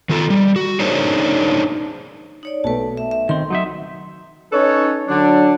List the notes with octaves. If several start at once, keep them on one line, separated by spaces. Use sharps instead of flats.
D#3 F4 A4
G3
F#4
D4 D#4 G#4 A#4 C5 C#5
D#4 C#5 D5
B1 A3 B4 A5
E5
E5
D#3 C4 C6
F#3 D#4 E5
C#4 D#4 A4 B4 C#5
D3 F#3 D4